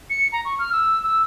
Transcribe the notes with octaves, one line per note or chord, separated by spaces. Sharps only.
C#7
A#5
C#6
F6
E6
E6